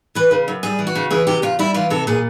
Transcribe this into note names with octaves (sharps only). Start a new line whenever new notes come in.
E3 B4
C#3
F#2
G3 G#4
E3
F#4
C#3
E3 G#4
C3 G4
E2 F4
G3 E4
E3 F4
C3 A4
A#2 G#4